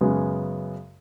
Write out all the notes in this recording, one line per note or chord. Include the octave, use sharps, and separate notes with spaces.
F#2 C#3 G#3 B3